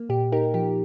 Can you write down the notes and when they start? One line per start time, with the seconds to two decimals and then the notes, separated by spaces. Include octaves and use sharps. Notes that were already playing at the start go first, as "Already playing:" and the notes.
Already playing: A#3
0.09 A#2 G4
0.32 D#4 G4 A#4
0.54 F3 G4